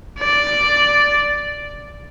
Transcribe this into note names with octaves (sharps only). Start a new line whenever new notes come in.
D5